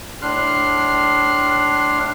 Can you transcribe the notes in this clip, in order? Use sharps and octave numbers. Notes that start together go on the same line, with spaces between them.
A2 D4 C6 F6 F#6